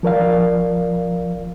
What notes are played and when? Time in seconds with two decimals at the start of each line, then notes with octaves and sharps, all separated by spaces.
0.03 F3 A#4 D5 F5